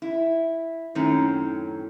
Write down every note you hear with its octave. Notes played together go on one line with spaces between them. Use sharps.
E4
F#2 A2 D#3 C4 C#4